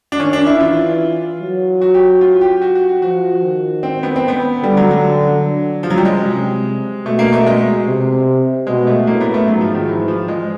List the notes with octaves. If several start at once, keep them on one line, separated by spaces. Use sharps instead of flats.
D4
D#3 C#4
D4
E4
E3 F4
F#3
F#4
G4
F4
G4
F#4
F#4
F#4
F3 F#4
D#3
C4
B3
C4
B3
D3 G3
F#3
F#3
C#3 F3
F#3
G3
G#3
C3
B2 A3
A#3
A3
G#3
C3
B2 G#3
A3
A2 A#3
B3
A3
G#2 F#3
F3
D#3
E3
F3
G#3